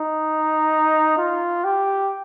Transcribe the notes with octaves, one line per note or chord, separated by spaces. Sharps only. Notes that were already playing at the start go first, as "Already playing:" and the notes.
Already playing: D#4
F4
G4